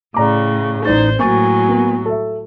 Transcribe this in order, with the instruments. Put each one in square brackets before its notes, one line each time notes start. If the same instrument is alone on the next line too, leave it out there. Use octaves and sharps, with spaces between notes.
[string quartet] A2 C#3 [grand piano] D5 A#5 D6
[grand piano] A1 D5 A6 [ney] D#4 [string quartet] C5
[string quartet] A2 F#3 [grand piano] A#3 C#6 A6 [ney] G#5
[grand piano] A#3 B3
A4 E5